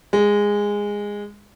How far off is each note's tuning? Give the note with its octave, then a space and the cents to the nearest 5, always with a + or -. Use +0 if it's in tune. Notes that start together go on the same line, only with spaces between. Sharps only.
G#3 -15